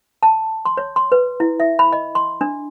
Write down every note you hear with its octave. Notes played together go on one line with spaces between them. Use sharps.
A5
C6
C#5
C6
B4
E4
E5
B5
D#5
C6
D4